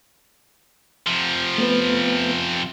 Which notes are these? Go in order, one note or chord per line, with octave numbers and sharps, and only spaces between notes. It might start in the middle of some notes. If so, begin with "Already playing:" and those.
C3 F3
A3 B3 B4